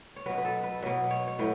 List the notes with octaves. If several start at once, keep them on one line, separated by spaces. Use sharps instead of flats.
C#5
B2 F#3 B4
B4
A4
B4
B2 F#3 B4
C#5
C#5
A2 F#3 B4